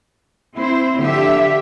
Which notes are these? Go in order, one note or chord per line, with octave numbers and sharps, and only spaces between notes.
C4 E4 C5
D3 F3 G4 E5